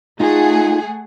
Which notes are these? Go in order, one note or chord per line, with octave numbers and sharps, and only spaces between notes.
A3 D#4 F4 G#4 F#5